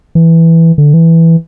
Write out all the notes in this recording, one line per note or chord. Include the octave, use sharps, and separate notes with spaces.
E3
D3
E3